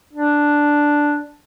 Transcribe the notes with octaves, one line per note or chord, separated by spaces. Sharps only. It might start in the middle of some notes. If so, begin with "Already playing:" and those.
D4